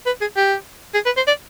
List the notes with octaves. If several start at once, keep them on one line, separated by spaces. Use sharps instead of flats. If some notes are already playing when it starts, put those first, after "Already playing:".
B4
G#4
G4
G#4
B4
C5
D5